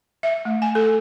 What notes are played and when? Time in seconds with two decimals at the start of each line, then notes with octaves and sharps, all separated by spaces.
0.23 E5
0.45 A3
0.62 G#5
0.75 A4